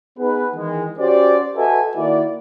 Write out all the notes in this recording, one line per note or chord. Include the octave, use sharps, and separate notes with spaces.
B3 D#4 G#4 B4
D#3 E3 G#3
C#4 F#4 G4 C5 D5
F#4 A4 B4 D#5 E5 G#5
D#3 A#3 E4 F#4 D5